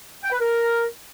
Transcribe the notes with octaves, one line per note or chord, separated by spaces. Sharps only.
G5
B4
A#4